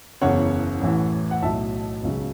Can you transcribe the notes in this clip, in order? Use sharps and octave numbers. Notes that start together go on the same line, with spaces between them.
F#1 E2 C#3 C#5 F#5
A1 A2 E3
F#5
B1 A2 F#3 E5 A5
C#2 C#3 F#3